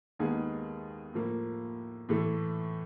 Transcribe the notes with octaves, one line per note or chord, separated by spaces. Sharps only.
D#2 D#3 G#3 B3 G#4
A2 F3 A#3
A2 E3 A3